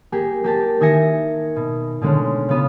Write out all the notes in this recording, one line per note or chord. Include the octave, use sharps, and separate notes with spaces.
A#3 G4 G#4
A#3 G4 A5
D#3 A#3 E5 G#5 A#6 C#7
B2
B2 D3 G#3 A3 C#4
C#3 B3 F4